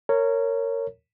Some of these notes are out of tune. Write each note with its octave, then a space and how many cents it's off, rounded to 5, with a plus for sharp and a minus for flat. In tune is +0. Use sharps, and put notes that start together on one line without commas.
A#4 -20 C#5 +0